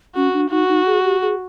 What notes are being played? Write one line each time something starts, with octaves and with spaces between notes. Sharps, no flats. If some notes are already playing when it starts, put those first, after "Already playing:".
C#4 F#4
D4
D#4 F#4
D#4
G#4
G4
G#4